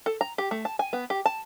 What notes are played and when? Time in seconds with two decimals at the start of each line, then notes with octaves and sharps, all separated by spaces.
0.06 A4
0.21 A#5
0.38 G4
0.51 A3
0.65 A5
0.79 G#5
0.93 B3
1.10 G4
1.26 A5